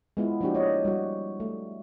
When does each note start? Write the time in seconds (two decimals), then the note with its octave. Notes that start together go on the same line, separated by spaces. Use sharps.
0.17 G#3 B3 E4 F4
0.41 F3 A#3 D4 F#4 G4
0.55 C#5 D#5
0.85 G3 F#4
1.40 A3